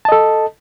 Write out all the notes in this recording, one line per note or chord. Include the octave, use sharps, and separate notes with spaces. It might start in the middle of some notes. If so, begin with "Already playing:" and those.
A4 D#5 A5